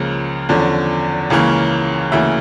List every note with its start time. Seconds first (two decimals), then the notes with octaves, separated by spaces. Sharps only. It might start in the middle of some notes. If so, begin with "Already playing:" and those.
Already playing: C#2 C#3 F3 A#3
0.49 E2 D3 F3 C#4
1.30 C#2 C#3 E3 A#3 C#4
2.12 D2 C#3 E3 A#3 E5